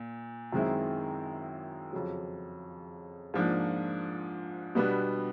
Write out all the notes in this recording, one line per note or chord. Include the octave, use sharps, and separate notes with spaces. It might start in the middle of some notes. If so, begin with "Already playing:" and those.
Already playing: A#2
F#2 D#3 G#3 C4 E4
F2 C#3 F#3
G#2 F3 A#3 D4
B2 G3 B3 D4